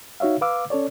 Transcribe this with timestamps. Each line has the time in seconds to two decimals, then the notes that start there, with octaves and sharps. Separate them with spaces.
0.20 D#4 F#4 C#5 E5 F5
0.41 B4 F5 D6 E6
0.70 C#4 A4 C#5 D5